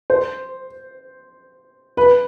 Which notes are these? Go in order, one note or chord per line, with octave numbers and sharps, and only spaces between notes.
C5
B4